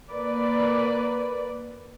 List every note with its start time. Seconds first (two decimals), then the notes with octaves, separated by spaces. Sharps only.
0.11 A#3 B4 D5